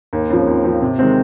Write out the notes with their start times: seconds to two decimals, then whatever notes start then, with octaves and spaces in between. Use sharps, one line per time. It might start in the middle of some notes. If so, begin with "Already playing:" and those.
0.13 D#2
0.30 C#3 F3 C4
0.47 D#2
0.64 C#3 F3 C4
0.82 C3
0.99 D#3 G#3 C4